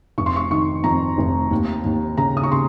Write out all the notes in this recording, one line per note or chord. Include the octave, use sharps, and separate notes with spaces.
F1 C#6
C6
C#6
D#3 C#6
F2 A#5
F1
D#2
D#2
C#3 A#5
D#6
C#6
C#3 C6